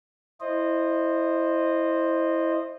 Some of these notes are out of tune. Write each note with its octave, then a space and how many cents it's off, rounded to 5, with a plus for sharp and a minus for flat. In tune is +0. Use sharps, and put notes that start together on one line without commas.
E4 +0 C5 +10 D#5 -20